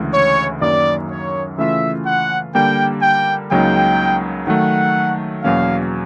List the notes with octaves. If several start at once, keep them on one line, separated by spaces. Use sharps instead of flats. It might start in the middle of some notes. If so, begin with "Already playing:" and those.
Already playing: D2 C#3 E3 G#3
C#5
F#2 D#3 F#3 A#3 D5
C#5
C#3 E3 A3 C#4 F4 E5
F#5
D3 G3 A#3 G5
G5
C#2 C#3 F#3 A#3 D#4 G5
D#3 F#3 A3 F#5
E2 B2 F#3 A#3 C#4 F5